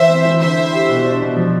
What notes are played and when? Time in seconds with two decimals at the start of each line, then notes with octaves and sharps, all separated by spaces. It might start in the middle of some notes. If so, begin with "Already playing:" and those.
Already playing: E3 C5 E5
0.09 C4
0.25 E3
0.41 D3 C5 E5
0.57 E4
0.73 G4
0.89 B2
1.05 D4
1.21 B2
1.36 F3